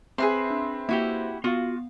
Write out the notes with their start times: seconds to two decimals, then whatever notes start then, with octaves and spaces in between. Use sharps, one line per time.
0.18 C4 G#4 B4 E5 C6
0.50 D4
0.89 A#3 E4 F#4 G4
1.44 B3 F4 F#4 F5